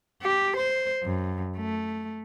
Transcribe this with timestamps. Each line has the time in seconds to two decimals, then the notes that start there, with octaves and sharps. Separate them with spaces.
0.23 G4
0.57 C5
1.03 F#2
1.57 A3